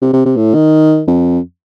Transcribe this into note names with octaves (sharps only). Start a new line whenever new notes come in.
C3
C3
C3
A2
D#3
F2